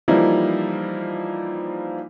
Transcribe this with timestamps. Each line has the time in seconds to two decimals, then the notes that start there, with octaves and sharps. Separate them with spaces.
0.08 E3 F3 G3 A#3 D#4 E4